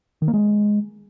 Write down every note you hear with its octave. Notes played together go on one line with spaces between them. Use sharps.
D#3
A#3
G#3